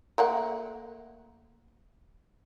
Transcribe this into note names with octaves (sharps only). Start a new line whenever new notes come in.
A3 A#3 F#5